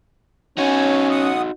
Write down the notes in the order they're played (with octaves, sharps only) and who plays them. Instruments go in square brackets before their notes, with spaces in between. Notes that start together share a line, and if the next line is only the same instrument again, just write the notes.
[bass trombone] C#4 [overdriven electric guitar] D#4 F#4 [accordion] C#5 G#5
[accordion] F#5 D#6